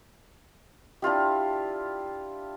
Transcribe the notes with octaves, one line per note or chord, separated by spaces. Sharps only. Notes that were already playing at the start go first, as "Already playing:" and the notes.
D4 E4 F4 G4